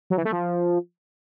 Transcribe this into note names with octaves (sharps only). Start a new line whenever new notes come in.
F#3
E3
A3
F3